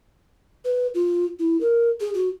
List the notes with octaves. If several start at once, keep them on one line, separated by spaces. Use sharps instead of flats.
B4
F4
E4
A#4
G#4
F#4